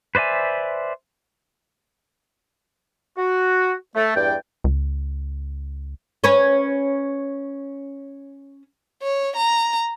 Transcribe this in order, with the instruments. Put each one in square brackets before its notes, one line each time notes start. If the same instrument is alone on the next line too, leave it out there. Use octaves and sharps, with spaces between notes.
[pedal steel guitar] B4 C5 D5 E5 G#5
[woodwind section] F#4
A3
E2 G2 D5 G5
[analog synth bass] C#2
[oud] C#4 B4 C#5
[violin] C#5
A#5